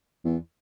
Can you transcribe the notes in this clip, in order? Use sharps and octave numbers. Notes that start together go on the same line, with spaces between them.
E2